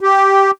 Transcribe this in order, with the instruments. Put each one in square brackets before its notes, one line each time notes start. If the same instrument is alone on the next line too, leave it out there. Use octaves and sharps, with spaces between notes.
[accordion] G4